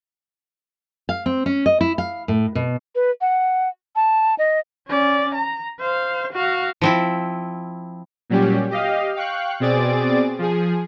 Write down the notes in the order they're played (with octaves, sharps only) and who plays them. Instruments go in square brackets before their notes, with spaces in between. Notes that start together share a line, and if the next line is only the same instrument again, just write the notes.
[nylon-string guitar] F5
C4
C#4
D#5
E4
F5
A2
B2
[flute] B4
F#5
A5
D#5
[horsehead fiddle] C#4 D5
A#5
C5 F5
F#4 F5
[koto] F3 C4 E4
[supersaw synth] A#2 F#3 G3 C#4 G4
G4 D#5 F5
F5 G5 C#6 F#6
B2 C4 G#4 D5 A6 D7
F3 G#4